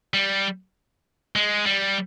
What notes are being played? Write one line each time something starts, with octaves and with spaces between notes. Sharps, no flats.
G3
G#3
G3